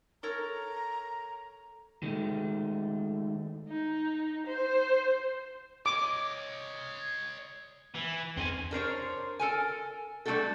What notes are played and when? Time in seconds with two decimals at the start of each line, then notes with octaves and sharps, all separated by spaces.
0.23 A4 A#4 C#5 A#5
2.03 D#3 G#3 A3
3.68 D#4
4.46 C5
5.86 C#5 D#5 D6
7.94 E3
8.37 F2 C4 G#5
8.71 D4 A#4 C5 C#5
9.39 A4 A#4 G#5
10.26 G3 A3 A#3 D4 F#4 A4